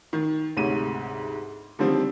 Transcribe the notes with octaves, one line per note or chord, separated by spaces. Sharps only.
D#3
D2 G#2 C3 C#5 D#7
D3 D#3 F3 G3 C4